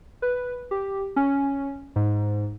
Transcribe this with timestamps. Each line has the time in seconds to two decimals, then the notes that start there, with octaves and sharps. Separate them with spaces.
0.22 B4
0.71 G4
1.16 C#4
1.96 G#2